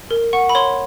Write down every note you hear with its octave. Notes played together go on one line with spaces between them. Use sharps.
A#4
F#5 C#6
B5
C#5 C6